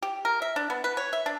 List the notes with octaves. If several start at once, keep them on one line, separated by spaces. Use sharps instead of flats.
G4
A#4
E5
D4
B3
B4
C#5
E5
D4